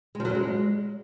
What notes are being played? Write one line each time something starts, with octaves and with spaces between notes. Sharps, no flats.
G#3
F3
F#3
A#2
G#3